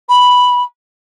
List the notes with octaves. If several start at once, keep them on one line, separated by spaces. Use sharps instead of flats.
B5